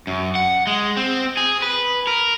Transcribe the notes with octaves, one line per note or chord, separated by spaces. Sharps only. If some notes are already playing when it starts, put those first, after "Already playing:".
F#2
F#5
G#3
C4
G#4
B4
A#4